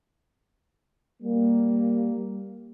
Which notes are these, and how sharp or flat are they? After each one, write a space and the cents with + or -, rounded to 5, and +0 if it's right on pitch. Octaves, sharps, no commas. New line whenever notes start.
G3 +0 A#3 +0